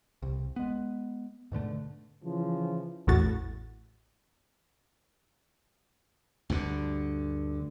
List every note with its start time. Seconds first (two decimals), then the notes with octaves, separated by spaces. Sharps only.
0.22 C2
0.56 G#3 B3
1.52 G#2 B2 D3 A3
2.25 C#3 E3 F3
3.07 A1 E2 A2 F#4 A6
6.50 D2 G2 D3